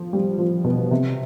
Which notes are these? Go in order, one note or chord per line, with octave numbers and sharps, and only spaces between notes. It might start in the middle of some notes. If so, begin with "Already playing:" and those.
Already playing: F3
G3
F3
B2
C3